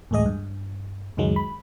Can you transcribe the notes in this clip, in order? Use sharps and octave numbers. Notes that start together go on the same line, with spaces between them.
A1 D2 G#3 G#4 D#5 D#6
G2
C#2 F#2 D#3 F#3 G#3
B5